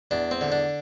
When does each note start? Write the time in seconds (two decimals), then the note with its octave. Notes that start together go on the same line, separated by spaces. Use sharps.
0.11 E2 D4
0.31 C4
0.41 D3
0.52 D4